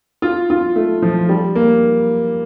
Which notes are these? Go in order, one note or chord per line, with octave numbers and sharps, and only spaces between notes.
F4
F4
A3
F3
G3
A#3